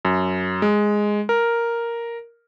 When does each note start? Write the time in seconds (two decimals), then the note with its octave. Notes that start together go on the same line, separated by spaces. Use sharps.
0.05 F#2
0.62 G#3
1.29 A#4